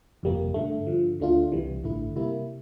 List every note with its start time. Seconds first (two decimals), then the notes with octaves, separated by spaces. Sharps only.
0.23 G1 F2 C3 G3 A#3
0.54 G2 D3 A3
0.87 G2 D3 F3
1.19 D2 D3 A3 D4 F4
1.52 C2 C3 E3 G3
1.83 A1 G2 D3 A3 E4
2.16 C3 G3 A#3 E4